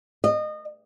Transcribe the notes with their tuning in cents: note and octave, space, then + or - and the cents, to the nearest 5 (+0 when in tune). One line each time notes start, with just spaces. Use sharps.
D#5 -25